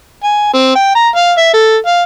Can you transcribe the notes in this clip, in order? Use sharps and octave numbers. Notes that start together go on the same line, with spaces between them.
G#5
C4
G5
A#5
F5
E5
A4
F5